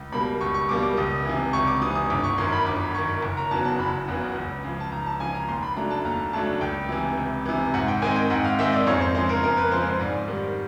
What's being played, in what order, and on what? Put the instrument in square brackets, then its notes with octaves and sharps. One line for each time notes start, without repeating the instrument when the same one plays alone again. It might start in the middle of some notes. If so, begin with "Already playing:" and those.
Already playing: [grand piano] C#2
B2 G3 A#3 B5
C#2 C#6
C#6
B2 G3 A#3 D6
D6
C#2 D#6
C3 E3
C#2 C#6
D6
C3 D#6
E3
D#6
G1 D6
C#6
F#2 D#3 C6
B5
G1 D6
F#2 D#3 C#6
F#1
A#5
E2 C#3 F#3 B3 A5
A5
F#1 B5
E2 C#3 F#3 B3
C#2
C#3 F3
A5
C#2 A#5
A5
C#3 F3 G#5
A#5
D#2 C6
B5
C#3 F#3 A3 D4 A#5
A5
D#2 A#5
C#3 F#3 A3 D4 A5
C#2 G5
C3 E3
C#2
C3 E3
G#2 F#5
G5
D#3 G#3 C4 D#4 G#5
G5
G#2 F#5
F5
D#3 G#3 C4 D#4 E5
D5
F2 C#5
C5
C#3 F3 G#3 C5
A#4
F2 A#4
B4
C#3 F3 G#3 C5
C5
G#2 D5
D#3 G3